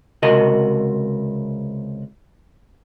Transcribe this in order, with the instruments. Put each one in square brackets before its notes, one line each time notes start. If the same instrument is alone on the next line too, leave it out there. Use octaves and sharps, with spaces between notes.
[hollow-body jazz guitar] C#2 C3 F#4 A#4 D#5